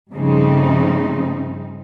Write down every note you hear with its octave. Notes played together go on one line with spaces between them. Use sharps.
G2 C#3 F3 A3 C4 D#4